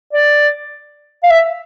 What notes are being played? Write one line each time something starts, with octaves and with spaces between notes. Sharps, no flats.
D5
F5
E5